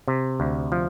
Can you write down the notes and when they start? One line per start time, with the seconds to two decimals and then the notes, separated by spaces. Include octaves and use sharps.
0.08 C3
0.40 D2
0.72 F3